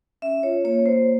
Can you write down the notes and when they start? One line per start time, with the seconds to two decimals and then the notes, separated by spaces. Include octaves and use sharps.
0.22 C#4 E5
0.43 F4 C#5
0.64 A#3 C#5
0.85 A#3 C5